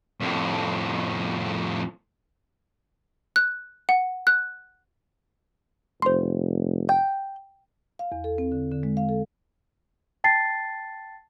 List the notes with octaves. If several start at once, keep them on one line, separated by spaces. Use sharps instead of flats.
F2 A2
F#6
F#5
F#6
F1 C5 C6
G5
F5
E2
A4
C4
D3
D3
G#3
F5
A4
G5 A5 A6 C7